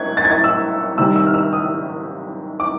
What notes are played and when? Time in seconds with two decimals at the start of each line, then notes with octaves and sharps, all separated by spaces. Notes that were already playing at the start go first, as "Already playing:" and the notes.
Already playing: F#6 G#6
0.17 A6
0.24 G#6
0.31 A6
0.44 E6
0.98 C3 D#3 G3 E6
1.16 E6
1.27 F6
1.34 E6
1.53 D#6
2.60 D6